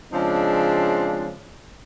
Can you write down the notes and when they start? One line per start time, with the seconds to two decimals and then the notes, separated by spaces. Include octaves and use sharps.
0.13 C#3 F3 G#3 C4 D4